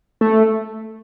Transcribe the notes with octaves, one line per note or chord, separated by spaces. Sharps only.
A3